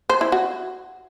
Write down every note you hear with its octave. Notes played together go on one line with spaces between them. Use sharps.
C5
E4
F#4